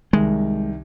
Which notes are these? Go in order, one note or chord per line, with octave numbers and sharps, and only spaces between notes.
C2 D#3 G#3